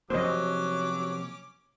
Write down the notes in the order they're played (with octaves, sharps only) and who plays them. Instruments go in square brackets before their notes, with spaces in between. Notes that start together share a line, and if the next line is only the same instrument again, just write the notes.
[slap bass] C3 F3 A#3 [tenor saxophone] F#3 [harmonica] C#4 D6 [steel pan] C5 D#5